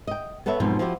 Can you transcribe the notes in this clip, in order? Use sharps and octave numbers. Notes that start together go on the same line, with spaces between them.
D#5 G5
B3 A4 B4 C#5 E5
G#2 B2 F3 F#3 C4 B4
F3 E4 F#4 G4